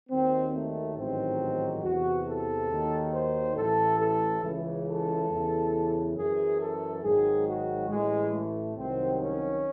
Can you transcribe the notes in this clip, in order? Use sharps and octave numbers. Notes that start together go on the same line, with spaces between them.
D#2 D#3 F#3 C4
A3
A1 G#2 D#3 F#3 C4
E2 C3 E3 F#4
A4
D#2 D#3 F#3
C5
A1 A2 E3 A4
A4
C#2 C#3 E3
A4
E2 C#3 E3
F#2 E3 G#4
A4
G#1 G#2 D#3 F#3 G#4
F#4
A1 A2 E3 G#3
A3
C2 C3 D#3 F#3 C4
C#4